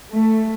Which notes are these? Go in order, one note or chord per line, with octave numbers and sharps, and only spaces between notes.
A3